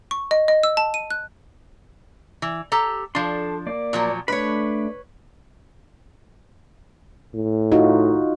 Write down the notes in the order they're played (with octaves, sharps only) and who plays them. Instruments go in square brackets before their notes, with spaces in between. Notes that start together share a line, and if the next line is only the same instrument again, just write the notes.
[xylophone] C#6
D#5
D#5
E6
A5
D#7
F#6
[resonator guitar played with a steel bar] E3
G4 A4 A#5
[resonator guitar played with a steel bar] F3 D4 [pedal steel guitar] A4 A5 C6
[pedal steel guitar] A#3 D5
[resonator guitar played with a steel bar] A#2 F3 F#3
[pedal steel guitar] A3 D4 B5 [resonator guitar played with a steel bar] B4 C#5
[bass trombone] A2
[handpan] D#4 F4 F#4